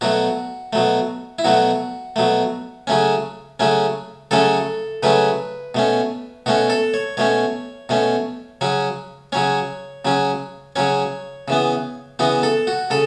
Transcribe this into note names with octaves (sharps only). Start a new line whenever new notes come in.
B2 F#3 A3 F#4
B2 F#3 A3
E4
B2 F#3 A3 F#4
B2 F#3 A3
C#3 F#3 A3 C#4
C#3 F#3 A3 C#4
C#3 F#3 A3 C#4 A4
C#3 F#3 A3 C#4 B4
B2 A3 C#4
B2 A3 C#4 F#4
A4
C#5
B2 A3 C#4 C#5
B2 A3 C#4
C#3 F#3 C#4
C#3 F#3 C#4 C#5
C#3 F#3 C#4
C#3 F#3 C#4 C#5
C#3 E3 B3
C#3 E3 B3 F#4
A4
F#4
C#3 A4